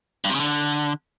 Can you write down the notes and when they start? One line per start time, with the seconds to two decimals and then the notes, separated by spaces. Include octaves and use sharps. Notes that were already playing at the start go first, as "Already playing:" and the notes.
0.24 G2
0.30 C3
0.35 C#3
0.40 D3